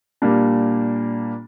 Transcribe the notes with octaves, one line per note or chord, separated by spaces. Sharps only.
A#2 G3 A#3 D4